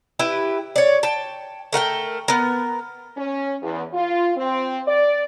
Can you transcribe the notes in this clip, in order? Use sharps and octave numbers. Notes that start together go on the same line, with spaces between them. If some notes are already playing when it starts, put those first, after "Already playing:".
E4 G4 B4
C#5 D5
G5 A5
A3 A#4 F#5 G5
B3 A#4
C#4
E2
F4
C4
D5